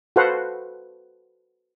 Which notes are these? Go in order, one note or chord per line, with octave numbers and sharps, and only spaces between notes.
F#4 A4 B4 C5 F5 F#5